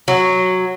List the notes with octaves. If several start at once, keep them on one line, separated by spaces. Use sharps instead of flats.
F#3